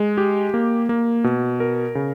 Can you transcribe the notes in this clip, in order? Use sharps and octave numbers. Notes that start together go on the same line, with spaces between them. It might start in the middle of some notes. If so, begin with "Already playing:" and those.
Already playing: G#3
G4
A#3
A#3
B2
A#4
C#3